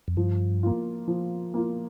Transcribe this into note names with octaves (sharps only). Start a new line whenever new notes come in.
F2
G2 F3
A#3 F4
F3
A#3 F4